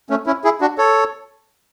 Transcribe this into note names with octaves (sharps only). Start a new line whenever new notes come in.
A3 C#4
C#4 E4
E4 G#4
D4 F#4
A4 C#5